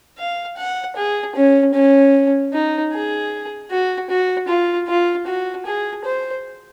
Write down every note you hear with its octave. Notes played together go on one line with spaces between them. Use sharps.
F5
F#5
G#4
C#4
C#4
D#4
G#4
F#4
F#4
F4
F4
F#4
G#4
C5